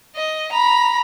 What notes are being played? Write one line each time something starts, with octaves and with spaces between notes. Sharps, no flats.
D#5
A#5 B5